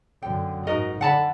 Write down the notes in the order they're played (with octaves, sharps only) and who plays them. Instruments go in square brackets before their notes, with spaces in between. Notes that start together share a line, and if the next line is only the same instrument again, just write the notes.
[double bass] F#2 D3 [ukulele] G5
[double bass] G#2 D#4 [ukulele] F#4 A#4 D#5
[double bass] D3 [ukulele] F#5 A5 B5